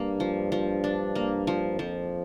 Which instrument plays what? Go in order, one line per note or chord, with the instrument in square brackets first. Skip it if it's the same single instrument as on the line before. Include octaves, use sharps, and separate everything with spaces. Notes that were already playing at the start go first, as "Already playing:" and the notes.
Already playing: [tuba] G2 [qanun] A#3 D4
[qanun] F3
F3
D4
A#3
F3
[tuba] F2 [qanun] F3